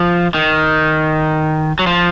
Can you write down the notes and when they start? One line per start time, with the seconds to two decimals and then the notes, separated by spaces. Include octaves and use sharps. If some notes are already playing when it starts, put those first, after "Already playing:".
Already playing: F3
0.34 D#3
1.79 F#3
1.87 F3